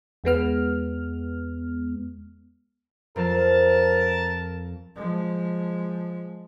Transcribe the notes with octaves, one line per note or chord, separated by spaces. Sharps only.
E2 G#3 B3 F6
F2 F3 A#4 F5 A5
F3 G#3